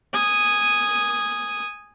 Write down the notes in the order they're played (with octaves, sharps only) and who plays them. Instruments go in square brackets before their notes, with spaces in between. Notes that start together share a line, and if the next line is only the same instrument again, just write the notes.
[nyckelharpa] G#5 D#6